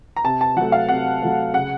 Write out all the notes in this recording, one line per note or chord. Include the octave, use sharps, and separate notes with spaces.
A#5
C3 A5
A5
F#3 A3 F#5
F5
C3 F#5
F#3 A3
C#3 F#5